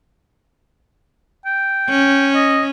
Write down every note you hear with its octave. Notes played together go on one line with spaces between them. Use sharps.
G5
C#4
D#5